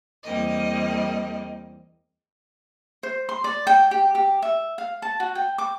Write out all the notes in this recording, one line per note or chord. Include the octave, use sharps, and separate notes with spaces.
E2 G3 A#3 C4 D#5
C5
C6
D5
G5
G4
G4
E5
F5
A5
F#4
G5
D6